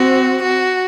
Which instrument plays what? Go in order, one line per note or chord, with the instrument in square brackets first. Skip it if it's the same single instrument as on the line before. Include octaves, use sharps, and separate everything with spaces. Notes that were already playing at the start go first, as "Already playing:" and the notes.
Already playing: [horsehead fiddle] C4 [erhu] F#4
[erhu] F#4